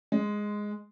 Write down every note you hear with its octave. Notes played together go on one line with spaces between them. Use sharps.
G#3